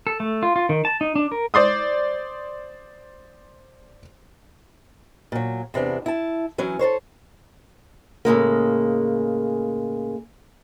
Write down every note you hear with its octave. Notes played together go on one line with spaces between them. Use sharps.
A4
A3
F4
F4
D#3
A5
D#4
D4
A#4
C5 D5 C6 D#6
A#2 F#3
E2 C3 B3 D4
E4 A5
E3 F#3 C#4
A4 A#4 C5 C#5
A2 C#3 G#3 A#3